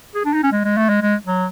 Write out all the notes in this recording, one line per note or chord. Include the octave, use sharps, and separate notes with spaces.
G#4
D4
D#4
C#4
G#3
G#3
A3
G#3
G#3
F#3